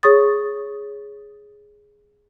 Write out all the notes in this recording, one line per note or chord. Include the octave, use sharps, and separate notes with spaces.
G#4 C#5 C#6 D#6 A6